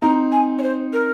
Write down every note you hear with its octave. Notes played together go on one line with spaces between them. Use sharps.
C4 D#4 A#5
G#5
C#5
C5
A#4